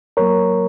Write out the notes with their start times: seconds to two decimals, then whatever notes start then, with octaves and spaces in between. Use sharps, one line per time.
0.17 F#3 A#3 A#4 C#5